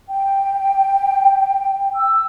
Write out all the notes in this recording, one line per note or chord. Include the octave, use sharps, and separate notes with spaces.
G5
E6